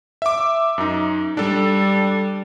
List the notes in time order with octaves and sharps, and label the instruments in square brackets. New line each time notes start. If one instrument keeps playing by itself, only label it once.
[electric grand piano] E5 D6
F#2 D#4
[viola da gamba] G3 [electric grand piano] D4 A4